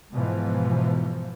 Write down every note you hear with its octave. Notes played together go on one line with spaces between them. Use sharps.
G#2 B2 E3 F3